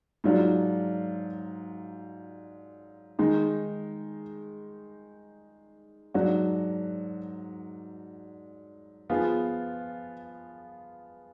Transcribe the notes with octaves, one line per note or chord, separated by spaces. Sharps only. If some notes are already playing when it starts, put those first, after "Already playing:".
G#2 F#3 D4 F4
D#3 G#3 D#4
G#2 F#3 D4 F#4
F3 B3 F4 G#4